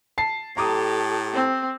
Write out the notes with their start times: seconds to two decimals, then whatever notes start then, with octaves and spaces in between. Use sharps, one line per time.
0.18 A5 C7
0.57 A2 G4 A4 A#5 D6 D#6
1.33 C4